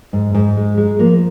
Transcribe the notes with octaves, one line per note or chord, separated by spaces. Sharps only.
G#2
G#2
G#3
G#3
F3 A#3